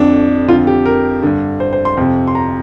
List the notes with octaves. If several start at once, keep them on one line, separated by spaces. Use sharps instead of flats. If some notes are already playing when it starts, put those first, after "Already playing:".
Already playing: F2 D3 D4
F2 D3 F4
G4
A#4
G2 D3
C5
C5
C6
F2 C3
C6
A#5